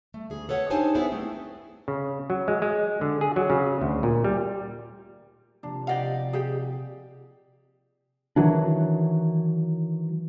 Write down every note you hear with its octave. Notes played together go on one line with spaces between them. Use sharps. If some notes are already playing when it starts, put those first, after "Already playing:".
A3
D2 G#4
A4 B4 C#5 F#5
D4 D#4 G4 C5 G#5 A5
B3 E4 G#4 A4 B4 C5
A3 C4
C#3
F#3
G#3
G#3
D3
G#4
F#3
C#3
D2
A#2
G3
C3 F3 A#3 D4
G4 D5 D#5 F5 F#5
G4 G#4
D#3 E3 F#3 D4